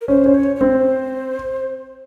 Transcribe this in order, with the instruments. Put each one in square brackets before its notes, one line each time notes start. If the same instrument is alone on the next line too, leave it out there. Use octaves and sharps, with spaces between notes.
[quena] A#4
[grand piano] C#4 [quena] C5
[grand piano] C#4
[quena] C#5
C#5
[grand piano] C4 [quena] C5